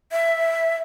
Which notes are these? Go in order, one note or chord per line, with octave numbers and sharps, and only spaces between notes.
E5